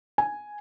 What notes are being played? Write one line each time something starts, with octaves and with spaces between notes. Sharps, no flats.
G#5